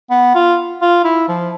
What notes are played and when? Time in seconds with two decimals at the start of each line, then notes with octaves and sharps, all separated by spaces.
0.10 B3
0.35 F4
0.82 F4
1.04 E4
1.29 F3